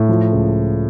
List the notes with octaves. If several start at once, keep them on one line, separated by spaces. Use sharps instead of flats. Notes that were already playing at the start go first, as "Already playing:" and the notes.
Already playing: A2
F3
C#2